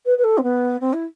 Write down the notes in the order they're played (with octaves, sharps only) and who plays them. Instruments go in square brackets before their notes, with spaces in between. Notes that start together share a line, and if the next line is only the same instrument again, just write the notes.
[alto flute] B4
B4
A4
C4
B3
C4
E4